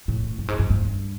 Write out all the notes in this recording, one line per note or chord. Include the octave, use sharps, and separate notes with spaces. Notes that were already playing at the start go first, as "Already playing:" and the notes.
A2
G2
G#2
G2
G2